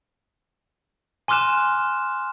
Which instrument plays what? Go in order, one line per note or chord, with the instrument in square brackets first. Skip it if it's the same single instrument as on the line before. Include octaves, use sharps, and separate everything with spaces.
[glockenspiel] G#5 C6 D6 F6 F#6 E7